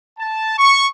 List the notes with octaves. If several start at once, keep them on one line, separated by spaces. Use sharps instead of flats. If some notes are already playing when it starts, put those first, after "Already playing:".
A5
C#6